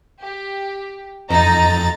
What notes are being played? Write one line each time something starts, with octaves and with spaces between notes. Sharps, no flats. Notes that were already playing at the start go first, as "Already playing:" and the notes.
G4
F2 D#4 A#5 A6